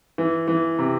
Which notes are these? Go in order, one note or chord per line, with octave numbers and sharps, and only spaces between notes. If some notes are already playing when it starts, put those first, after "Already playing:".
E3
E3
C3